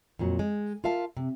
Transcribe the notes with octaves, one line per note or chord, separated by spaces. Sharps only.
F2 A#2 F#3
G#3
F4 A#4 E5 F5 A5
C3